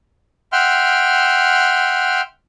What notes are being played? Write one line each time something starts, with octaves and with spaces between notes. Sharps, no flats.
E5 F#5 G5 C6 F6